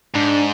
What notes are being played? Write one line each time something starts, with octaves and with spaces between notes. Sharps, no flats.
G#2 D4